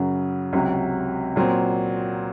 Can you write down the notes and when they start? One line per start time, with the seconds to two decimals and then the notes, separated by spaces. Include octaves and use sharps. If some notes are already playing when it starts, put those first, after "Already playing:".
Already playing: F#2 C#3 F#3
0.53 C#2 C3 F#3
1.36 A#2 F#3 C4